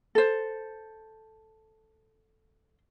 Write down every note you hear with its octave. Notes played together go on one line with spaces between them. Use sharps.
A4 C5